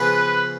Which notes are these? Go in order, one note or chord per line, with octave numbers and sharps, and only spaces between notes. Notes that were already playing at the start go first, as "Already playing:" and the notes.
Already playing: C#3 F3 B3 F4 G#4 B4